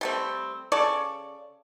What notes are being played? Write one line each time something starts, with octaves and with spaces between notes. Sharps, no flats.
G3 A3 C4
C#3 A4 D5 C#6